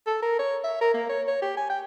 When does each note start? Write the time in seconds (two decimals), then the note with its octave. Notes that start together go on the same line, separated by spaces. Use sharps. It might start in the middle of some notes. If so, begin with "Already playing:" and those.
0.07 A4
0.22 A#4
0.40 C#5
0.64 E5
0.81 A#4
0.94 A#3
1.09 C#5
1.28 C#5
1.42 G4
1.57 G#5
1.70 G5